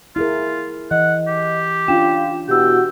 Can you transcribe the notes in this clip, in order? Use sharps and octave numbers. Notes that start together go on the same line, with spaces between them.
E4 F4 G#4 A#4
E3 D#5 F#5
G4
C#4 D4 F4 G5 E7
B2 E4 F#4 G4 G5 E6